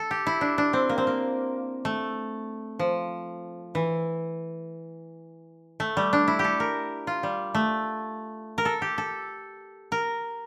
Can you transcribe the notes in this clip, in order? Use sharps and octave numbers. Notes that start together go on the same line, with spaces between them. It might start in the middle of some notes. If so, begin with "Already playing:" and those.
Already playing: A4
G4
E4
D4
D4
C4
A#3
C4
A#3
A3
F3
E3
A3
G3
D4
E4
G4
A4
A#4
F4
G3
A3
A#4
A4
G4
A4
A#4